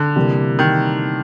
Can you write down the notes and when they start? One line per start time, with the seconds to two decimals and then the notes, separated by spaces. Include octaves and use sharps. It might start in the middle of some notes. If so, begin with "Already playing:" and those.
Already playing: D3
0.16 C3 E3 G3 A#3
0.59 D#3